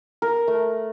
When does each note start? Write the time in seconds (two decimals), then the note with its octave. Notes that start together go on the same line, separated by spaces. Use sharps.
0.22 A#4
0.48 A3